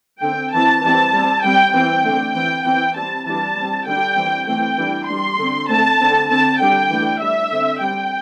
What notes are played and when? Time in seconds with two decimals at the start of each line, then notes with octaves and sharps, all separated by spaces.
0.22 D3 C4 G5
0.53 E3 C4 A5
0.83 E3 G3 C4 A5
1.13 G3 C4
1.44 G3 C4 G5
1.74 E3 C4 G5
2.05 D3 A3 C4
2.35 E3 C4 G5
2.65 E3 C4 G5
2.95 G3 C4 A5
3.26 E3 G3 D4 A5
3.56 G3 C4
3.87 D3 G3 D4 G5
4.17 E3 G3 C4
4.48 E3 A3 C4 G5
4.78 E3 G3 D4
5.08 G3 D4 C6
5.39 D3 C4
5.69 D3 A3 C4 A5
5.99 D3 C4
6.30 D3 C4 A5
6.60 D3 G3 D4 G5
6.90 E3 A3 D4
7.21 G3 D4 E5
7.52 D3 C4
7.81 G3 C4 G5